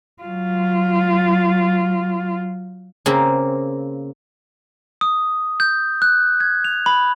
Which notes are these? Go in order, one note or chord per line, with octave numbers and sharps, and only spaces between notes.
F#3 F4
C#3 A#3 C4
D#6
G6
F#6
G#6
F7
B5